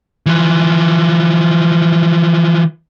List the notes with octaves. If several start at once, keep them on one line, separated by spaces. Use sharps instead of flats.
E3 F3